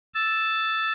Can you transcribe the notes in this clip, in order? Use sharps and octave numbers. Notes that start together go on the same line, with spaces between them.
E6 A6